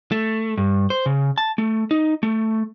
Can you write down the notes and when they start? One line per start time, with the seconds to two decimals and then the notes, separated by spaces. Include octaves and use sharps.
0.12 A3
0.58 G2
0.90 C5
1.06 C#3
1.38 A5
1.58 A3
1.91 D#4
2.23 A3